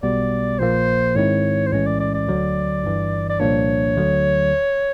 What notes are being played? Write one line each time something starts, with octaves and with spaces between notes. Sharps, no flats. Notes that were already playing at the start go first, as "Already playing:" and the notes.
B1 B2 G3 B3 D5
A#1 A#2 F3 A#3 C5
G#2 D#3 G#3 C4 E4 C#5
C5
B1 A2 E3 G#3 C#4 C#5
D5
D5
D5
D2 D3 F#3
G1 G2 E3
D5
C2 A#2 F3 A#3 D4 C#5
D2 D3 F#3